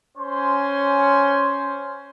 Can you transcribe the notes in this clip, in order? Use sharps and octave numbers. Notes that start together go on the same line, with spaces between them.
C#4 C5 G#5 C6